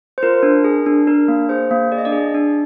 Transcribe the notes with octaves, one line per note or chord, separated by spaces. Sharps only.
C5
F4 A#4
D4
G#4
D4
D4 A#4
A#3
G#4 C5
A#3
G#4 D5
D#5
D4 D5
G#4
D4